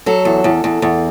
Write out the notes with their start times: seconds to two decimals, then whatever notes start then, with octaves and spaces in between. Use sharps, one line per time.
0.06 F#3 A4
0.25 E2
0.44 E2
0.64 E2
0.82 E2